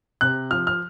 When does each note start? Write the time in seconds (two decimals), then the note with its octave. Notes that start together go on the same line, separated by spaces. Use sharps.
0.21 C3 F#6
0.51 F3 F6
0.67 F6